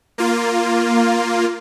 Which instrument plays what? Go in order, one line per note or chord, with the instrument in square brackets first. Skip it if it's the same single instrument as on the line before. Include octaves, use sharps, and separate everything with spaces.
[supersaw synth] A#3 F4